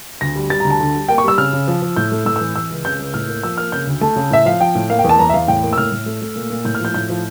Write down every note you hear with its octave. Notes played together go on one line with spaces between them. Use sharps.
D2 A#6
G3
G3 A6
D2 A#5
A5
D3
G3
A#3 G5
C#6
G3 E6
C#3 F6
C#3
F3
F3
A2 G6
A3
A2 E6
E3 E6
E3 E6
C#2
C#3 G6
C#2
A2 F6
A#3
F3 E6
A#3 F6
C#3 G6
D2
A3 A5
C#3
A2 E5
F3 F5
F3 G5
A2
A#3 F5
G5
E2
A5
E2 A#5
E5
E2 F5
A2 G5
A#3
E6
A2 F6
A2
A3
A3
A#2
A#2
A2 G6
F6
F3 G6
A2 G6
F3